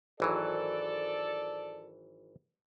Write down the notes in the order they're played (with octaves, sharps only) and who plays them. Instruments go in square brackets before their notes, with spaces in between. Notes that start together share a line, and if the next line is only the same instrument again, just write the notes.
[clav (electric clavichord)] G#1 E3 F#3 [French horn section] A4 D5